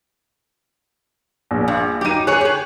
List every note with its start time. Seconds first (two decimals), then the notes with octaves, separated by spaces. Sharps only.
1.51 A#1
1.68 G2
2.01 F#3 D#4 G4 D#7
2.27 G#4 C#5 F#6
2.41 G4 G#4